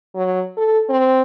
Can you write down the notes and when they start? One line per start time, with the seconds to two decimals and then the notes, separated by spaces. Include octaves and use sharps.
0.15 F#3
0.57 A4
0.89 C4